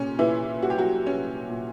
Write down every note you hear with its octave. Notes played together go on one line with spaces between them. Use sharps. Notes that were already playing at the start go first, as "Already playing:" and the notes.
Already playing: A#2 G3 C#4
A#2 E3 E4
G3 F#4
G4
F#3 F#4
G3 C#4
A#2